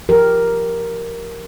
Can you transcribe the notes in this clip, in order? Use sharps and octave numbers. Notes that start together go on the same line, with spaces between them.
F3 G4 A#4